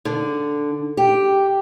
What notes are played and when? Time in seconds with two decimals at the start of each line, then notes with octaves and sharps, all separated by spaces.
0.05 D3
0.97 G4